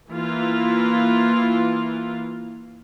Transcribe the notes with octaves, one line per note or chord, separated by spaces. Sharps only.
E3 A#3 E4 F4